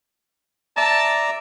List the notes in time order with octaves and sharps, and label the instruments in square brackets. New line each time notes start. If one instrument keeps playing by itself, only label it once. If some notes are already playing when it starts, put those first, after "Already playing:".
[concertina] D5 A#5 [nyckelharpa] E5 [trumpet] A5